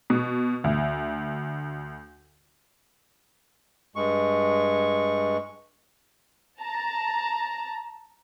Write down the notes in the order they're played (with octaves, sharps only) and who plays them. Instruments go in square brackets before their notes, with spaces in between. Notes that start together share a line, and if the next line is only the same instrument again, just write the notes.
[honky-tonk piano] B2
D2
[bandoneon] G2 G#3 C#6
[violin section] A5 A#5